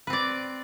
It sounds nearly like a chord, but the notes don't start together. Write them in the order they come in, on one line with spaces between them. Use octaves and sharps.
B4 C4 D5